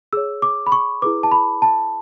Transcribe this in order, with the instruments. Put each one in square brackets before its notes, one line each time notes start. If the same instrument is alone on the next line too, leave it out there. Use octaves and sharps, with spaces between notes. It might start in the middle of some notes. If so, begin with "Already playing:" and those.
[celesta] G#4 C#5 E6
D6
B5
C#6
E4 G#4 B4 D6
A5
B5
A5